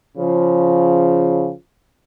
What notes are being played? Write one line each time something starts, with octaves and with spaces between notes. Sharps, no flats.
C#3 F3